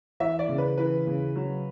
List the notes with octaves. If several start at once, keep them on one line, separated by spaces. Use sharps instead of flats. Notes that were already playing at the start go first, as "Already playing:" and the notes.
E3 E5
D5
C#3
B4
E3 B4
C#3
F#3